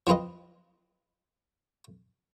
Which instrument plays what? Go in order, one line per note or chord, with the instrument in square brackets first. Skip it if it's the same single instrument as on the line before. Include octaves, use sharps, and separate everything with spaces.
[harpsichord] F3 C4 F4 B4 D#5